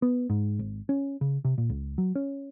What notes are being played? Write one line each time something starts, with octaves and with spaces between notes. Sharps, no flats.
B3
G#2
G#1
C#4
C#3
C3
A#2
C#2
F#3
C#4